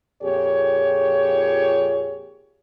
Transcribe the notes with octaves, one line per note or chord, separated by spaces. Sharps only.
F2 A#2 G4 G#4 C#5